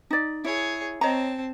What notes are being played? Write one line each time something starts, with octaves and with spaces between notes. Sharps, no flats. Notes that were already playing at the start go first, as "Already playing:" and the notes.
D#4 D5
E4 G#4 C#5
C4 C#5 D#5 A5 A#5